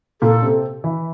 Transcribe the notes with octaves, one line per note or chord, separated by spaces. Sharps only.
A#2 A#3 A4
C3 C4
E3 E4